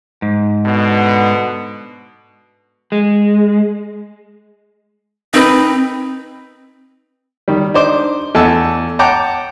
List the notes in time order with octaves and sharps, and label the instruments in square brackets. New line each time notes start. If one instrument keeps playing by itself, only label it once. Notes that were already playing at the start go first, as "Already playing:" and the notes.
[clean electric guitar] G#2
[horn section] B2 D3 B3
[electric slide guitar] G#3
[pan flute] C4 [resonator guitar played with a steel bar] D#4 B4
[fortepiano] D#3 G3
D4 D#4 C5 D6
E2 A3 F#5 A5 E6
C#5 F#5 G5 A5 A#5 D6